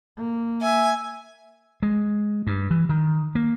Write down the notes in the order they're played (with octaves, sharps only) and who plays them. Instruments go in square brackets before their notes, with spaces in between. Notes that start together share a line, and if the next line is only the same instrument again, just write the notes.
[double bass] A#3
[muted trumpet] E5 [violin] G#5
[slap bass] G#3
G2
E3
D#3
A#3